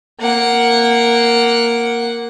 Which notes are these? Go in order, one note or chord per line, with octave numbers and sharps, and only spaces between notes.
A#3 F#5